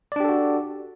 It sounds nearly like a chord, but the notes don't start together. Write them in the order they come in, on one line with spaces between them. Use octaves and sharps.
D5 D4 G4 A4 F#4